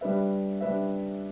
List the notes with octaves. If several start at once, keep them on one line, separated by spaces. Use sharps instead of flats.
G3 D4 B4 E5
G3 D4 B4 E5